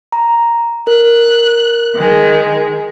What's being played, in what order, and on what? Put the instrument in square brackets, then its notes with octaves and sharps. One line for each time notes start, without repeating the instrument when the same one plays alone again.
[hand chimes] A#5
[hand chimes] A#4 [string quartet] F#6
[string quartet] D#3 G#3